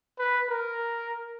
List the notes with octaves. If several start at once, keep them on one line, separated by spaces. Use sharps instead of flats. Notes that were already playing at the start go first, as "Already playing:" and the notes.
B4
A#4